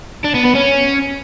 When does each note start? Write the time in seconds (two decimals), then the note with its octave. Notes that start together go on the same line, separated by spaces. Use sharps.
0.24 D4
0.34 B3
0.45 B3
0.55 C#4